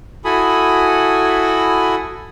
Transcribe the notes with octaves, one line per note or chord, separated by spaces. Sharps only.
E4 F#4 A4 G#5 B5 D#6